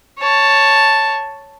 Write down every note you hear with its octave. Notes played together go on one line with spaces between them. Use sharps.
C#5 A5